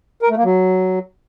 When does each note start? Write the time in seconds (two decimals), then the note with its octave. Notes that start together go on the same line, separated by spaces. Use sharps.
0.22 A#4
0.29 A3
0.37 A#3
0.44 F#3